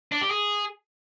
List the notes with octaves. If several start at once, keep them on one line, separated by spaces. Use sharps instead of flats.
D4
G4
G#4